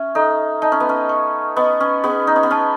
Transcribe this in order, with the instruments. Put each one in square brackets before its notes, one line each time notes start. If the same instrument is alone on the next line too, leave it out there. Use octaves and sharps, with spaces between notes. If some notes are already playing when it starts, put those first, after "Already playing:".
Already playing: [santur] C#4 [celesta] E5
[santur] D#4 [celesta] A4
[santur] D#4 [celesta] A5
[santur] C#4
B3
C#4
[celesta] C#6
[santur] B3 [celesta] D#5
[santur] C#4
[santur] B3 [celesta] G#4
[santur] D#4
C#4
B3
[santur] C#4 [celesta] A5